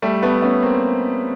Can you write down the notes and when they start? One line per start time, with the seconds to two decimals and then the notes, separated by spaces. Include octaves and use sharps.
0.02 G3 A3
0.23 A3 B3
0.42 B3 C#4
0.63 A#3 C4